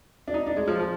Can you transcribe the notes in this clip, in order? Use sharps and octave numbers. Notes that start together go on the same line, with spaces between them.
D4
D#4
D4
G#3
F3
F3